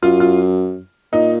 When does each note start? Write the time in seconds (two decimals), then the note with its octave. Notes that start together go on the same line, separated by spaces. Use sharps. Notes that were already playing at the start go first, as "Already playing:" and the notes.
0.03 F#2 F4
0.20 F4
1.13 A#2 D#4